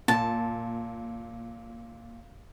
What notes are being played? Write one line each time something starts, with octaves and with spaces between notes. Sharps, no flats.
A#2 A5